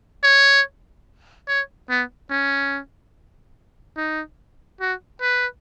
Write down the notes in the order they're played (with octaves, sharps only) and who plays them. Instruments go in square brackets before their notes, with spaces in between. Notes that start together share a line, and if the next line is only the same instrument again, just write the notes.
[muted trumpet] C#5
C#5
B3
C#4
D#4
F#4
B4